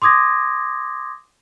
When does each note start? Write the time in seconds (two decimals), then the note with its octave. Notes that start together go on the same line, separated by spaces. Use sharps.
0.02 C6 D6 D#6 G#6 A#6